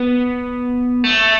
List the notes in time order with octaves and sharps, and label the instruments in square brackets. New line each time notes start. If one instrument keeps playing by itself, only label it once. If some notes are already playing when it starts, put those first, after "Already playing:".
Already playing: [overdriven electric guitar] B3
A3